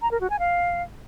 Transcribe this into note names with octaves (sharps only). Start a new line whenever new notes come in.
A#5
A#4
F#4
G#5
F5